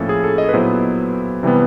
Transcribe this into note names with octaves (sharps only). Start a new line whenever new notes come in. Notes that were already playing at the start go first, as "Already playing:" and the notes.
Already playing: A2 F3 A#3 C#4 E4 A4
G#4
A4
D#5
B4
A#2 F#3 B3 E4 C5
C3 E3 G3 B3